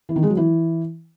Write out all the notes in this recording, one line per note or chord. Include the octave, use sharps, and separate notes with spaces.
E3
D#3
G#3
F#3
E3